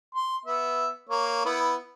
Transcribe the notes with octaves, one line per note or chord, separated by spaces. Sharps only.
C6
B3 E5
A#3 C#5
B3 E4